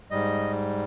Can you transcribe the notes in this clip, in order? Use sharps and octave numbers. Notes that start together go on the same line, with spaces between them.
G#2 G3 D#5